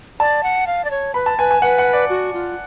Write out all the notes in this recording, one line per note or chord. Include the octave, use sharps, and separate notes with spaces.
D5 A5
F#5
F5
D5
C#5
B4 B5
A5
B4 G#5
G#5
B4 F#5
F#5
D5
F#4
F4